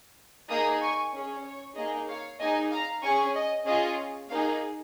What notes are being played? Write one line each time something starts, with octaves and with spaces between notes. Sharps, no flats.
A#3 D#4 G#4 A#5 D#6
G#5 C#6
C#4 G#4
C#5
A#3 D#4 G#4 D#5
C#5 F5
A#3 D#4 G#4 D#5 G#5
F5 A#5
C#4 G#4 G#5 C#6
D#5
C#4 F4 G#4 D#5
A#3 D#4 G#4 C#5 F5